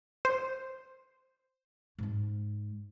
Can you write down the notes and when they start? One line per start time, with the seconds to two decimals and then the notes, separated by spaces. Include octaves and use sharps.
0.25 C5
1.98 G#2 G#3